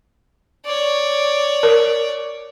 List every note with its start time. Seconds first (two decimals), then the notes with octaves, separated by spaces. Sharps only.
0.65 C#5 D5
1.63 A#4